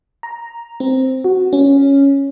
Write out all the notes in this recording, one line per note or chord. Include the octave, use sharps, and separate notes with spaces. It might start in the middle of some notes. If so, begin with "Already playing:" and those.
A#5
C4
F#4
C#4